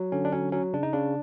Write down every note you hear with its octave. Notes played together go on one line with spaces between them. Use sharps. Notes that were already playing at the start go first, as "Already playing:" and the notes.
Already playing: F#3
D3 C#4
D4
F#3 C#4
F#3 C#4
C#3 D4
D#4
C#3 D4